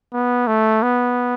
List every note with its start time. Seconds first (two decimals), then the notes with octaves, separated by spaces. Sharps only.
0.13 B3
0.47 A3
0.83 B3